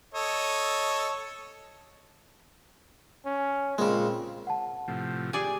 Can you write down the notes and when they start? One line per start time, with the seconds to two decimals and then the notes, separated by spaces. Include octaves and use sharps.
0.14 A4 C#5 D#5
3.25 C#4
3.78 A#2 C#3 G#3 C4
4.47 F#5 A5
4.88 A2 C3 F3
5.33 G4 G#4 D5 G#5